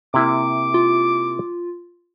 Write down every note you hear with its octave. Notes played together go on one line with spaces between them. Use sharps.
C3 A#3 E4 D6
F4